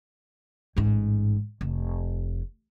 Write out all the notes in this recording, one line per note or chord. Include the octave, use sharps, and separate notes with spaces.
A1 G#2
F1